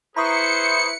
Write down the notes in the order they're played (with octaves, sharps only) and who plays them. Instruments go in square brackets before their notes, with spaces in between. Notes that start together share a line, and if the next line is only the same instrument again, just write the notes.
[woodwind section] E4 B4 [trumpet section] G#4 C5 [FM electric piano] A#5 C#6 D#6 [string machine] C#7